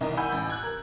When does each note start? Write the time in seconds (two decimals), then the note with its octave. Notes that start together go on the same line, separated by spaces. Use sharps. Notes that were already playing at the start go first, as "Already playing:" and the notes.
0.01 C2 D#3 E3 A#4 D#5
0.17 F#5 G#5 B5 E6 G6
0.32 A1
0.50 F#6 G#6
0.63 A#4